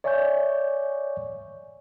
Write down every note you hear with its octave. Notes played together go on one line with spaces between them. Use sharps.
C#5 D5 E5 G#5 C#6 G6